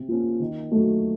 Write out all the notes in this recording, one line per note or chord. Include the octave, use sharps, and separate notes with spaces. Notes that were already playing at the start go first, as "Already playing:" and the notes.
Already playing: C3
F3 A#3 C#4
D#3
F#3 A3